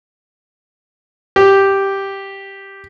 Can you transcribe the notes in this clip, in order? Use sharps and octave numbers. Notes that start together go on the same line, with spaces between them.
G4